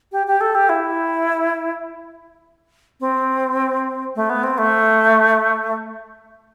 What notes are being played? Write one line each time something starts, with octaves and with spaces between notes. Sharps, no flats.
G4
G4
A4
G4
E4
C4
A3
B3
C4
A3